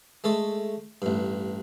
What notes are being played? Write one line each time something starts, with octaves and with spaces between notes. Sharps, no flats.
G#3 A3 A4
A1 G2